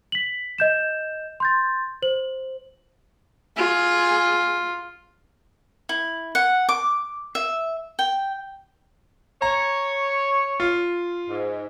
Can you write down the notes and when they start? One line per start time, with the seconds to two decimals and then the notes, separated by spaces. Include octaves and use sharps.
0.12 B6 F#7
0.58 D#5 G6 E7
1.40 C6 G6 A6
2.02 C5 F#7
3.57 F4 G#4
5.89 E4
6.35 F#5
6.69 D6
7.35 E5
7.99 G5
9.42 C#5 A#5
10.60 F4
11.29 G#2